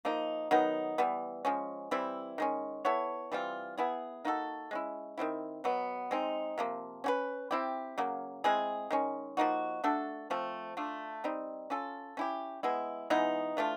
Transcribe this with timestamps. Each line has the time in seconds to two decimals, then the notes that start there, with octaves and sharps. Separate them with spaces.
0.05 F3 A#3 D#4
0.51 D#3 F#3 B3 D#4
0.98 E3 G3 B3
1.45 F3 G#3 C#4
1.91 E3 G3 C4 E4
2.38 D#3 G#3 C#4
2.85 B3 E4 A4 C#5
3.32 E3 G3 C4 F4
3.77 B3 E4 G#4
4.25 A#3 D#4 F#4 A4
4.71 G#3 C#4 E4
5.18 D#3 G3 C4 E4
5.64 B2 F#3 B3
6.11 G#3 C4 D#4
6.58 C3 F3 A#3
7.04 C#4 F#4 B4
7.51 C4 E4 G4
7.98 C#3 F#3 A#3
8.44 G#3 C4 E4 G#4
8.91 D#3 G#3 C#4
9.37 F3 A#3 D#4 F#4
9.84 A3 D4 F#4 A4
10.30 F3 A3 C4
10.77 A3 D4 F4
11.24 G3 C4 D#4
11.70 C#4 F4 A4
12.17 C#4 E4 G4
12.63 G#3 B3 E4
13.10 E3 G#3 B3 D#4
13.57 E3 A3 D4 F4